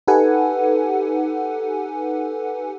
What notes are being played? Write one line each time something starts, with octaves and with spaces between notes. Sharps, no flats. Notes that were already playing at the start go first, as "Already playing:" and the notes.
D#4 G4 A4 B4 F#5 G#5